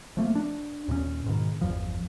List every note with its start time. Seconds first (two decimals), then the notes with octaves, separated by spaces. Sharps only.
0.17 F3 A3 A#3
0.35 D4
0.88 D#2 A#2 G#3 C#4
1.26 G#2 B2 D#3
1.61 G1 E2 G2 F3